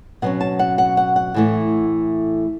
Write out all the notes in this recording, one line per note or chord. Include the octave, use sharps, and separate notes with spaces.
B2 F#3 C#4 F#5
A5
F#5
F#5
F#5
F#5
A2 E3 A3